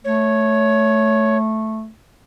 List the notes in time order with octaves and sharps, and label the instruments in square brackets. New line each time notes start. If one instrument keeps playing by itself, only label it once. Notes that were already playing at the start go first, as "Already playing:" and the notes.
[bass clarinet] A3 [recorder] C#5